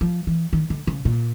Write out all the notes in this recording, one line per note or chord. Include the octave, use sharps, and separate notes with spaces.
F3
E3
D#3
D3
C#3
A#2